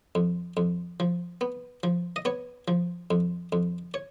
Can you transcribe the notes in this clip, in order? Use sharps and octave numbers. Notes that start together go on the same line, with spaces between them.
F2
F2
F3
B3
F3
D#5
B3 C#5
F3
F2
F2
C#5